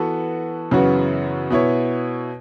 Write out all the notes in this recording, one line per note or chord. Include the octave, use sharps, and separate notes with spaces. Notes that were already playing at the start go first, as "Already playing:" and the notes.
Already playing: E3 B3 F#4 A4
F#2 C#3 E3 B3 F#4
B2 B3 E4 C#5